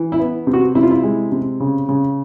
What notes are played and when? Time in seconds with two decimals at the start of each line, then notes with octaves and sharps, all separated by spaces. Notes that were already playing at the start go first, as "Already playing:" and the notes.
Already playing: E3
0.12 E4
0.19 B3
0.47 C3
0.53 F#4
0.75 C3 E4
0.83 F4
0.91 E4
1.03 G#3
1.32 C3
1.60 C#3
1.89 C#3